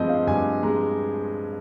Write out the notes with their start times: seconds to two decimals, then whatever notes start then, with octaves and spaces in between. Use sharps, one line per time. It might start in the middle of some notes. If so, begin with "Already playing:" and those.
Already playing: G2 F3 G#3 C4 D#5
0.09 F5
0.27 G2 G#5
0.63 G#3 A#5